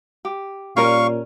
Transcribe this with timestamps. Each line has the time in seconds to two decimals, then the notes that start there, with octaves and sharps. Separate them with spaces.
0.25 G4
0.77 A#2 G3 C#4 A#4 F5 C#6